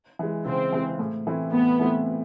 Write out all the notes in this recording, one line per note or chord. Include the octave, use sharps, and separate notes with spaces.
E3 G#3
C#3 C4
E3 G#3
A2
E3 A3 C4 E4
A2 B3
E3 A3 C4 E4